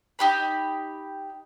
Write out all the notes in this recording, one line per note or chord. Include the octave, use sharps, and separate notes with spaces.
D#4 G4 B5